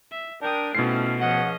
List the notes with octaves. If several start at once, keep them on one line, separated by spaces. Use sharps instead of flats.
E5
D4 A#4 G5 D#6
B2 A3 C4 C#4 E4 F4 C7
C#2 F3 C#4 D#5 F#5